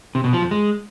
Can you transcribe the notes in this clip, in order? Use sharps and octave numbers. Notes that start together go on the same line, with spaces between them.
C3
B2
F3
F2
G#3